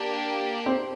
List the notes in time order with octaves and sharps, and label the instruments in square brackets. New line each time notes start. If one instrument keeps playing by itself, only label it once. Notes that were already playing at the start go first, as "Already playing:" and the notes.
Already playing: [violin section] A#3 D4 G4
[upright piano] C4 C5